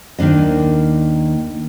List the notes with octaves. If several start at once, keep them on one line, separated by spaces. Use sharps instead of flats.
D#2 D#3 A#3 D4 D#5